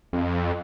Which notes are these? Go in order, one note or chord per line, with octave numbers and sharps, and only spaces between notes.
F2